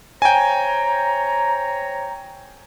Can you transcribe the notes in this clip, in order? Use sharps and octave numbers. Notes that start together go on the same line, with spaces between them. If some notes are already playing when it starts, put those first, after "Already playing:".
C5 C#5 G5 G#5 A#5